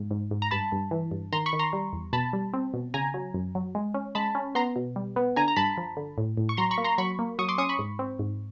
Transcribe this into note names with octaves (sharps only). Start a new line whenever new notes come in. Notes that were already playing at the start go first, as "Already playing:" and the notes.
Already playing: G#2
G#2
G#2
A#5
G2 A5 B5
G2
E3
G2
D#3 A#5 C6
B5 C#6
D#3
A#5 C6
G3
E2
B2 A5 B5
G3
C4
B2
C#3 G#5 A#5
F#3
F#2
F#3
G#3
C#4
G#3 A5 B5
C#4
B3 A#5 C6
B2
G3
B3
D3 G#5 A#5
A#5
G2 A5 B5
F3
D3
A2
A2
C#6
F#3 A#5 C6
B5 C#6
A#3
A#5 C6
F#3 B5 C#6
A#3
F#3 C#6 D#6
C6 D6
C#4 C#6 D#6
B5 C#6
G#2
C4
G#2